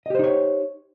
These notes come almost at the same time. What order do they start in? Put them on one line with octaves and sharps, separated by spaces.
D#5 G4 C5 D#4 C#5